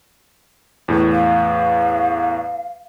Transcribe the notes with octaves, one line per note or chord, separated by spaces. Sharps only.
E2 A2
F5